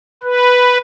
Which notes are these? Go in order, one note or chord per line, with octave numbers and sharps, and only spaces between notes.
B4